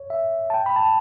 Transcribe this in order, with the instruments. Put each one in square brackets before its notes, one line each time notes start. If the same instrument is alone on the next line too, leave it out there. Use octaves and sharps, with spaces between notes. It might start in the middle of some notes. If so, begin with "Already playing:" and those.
Already playing: [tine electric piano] C#5
E5
A5
G5
B5
A5